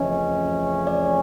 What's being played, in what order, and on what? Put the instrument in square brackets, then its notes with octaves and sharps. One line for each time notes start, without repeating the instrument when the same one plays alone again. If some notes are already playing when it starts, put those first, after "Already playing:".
Already playing: [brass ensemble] F2 C#3 E3 A3 C#4 [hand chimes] D#5
[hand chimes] D5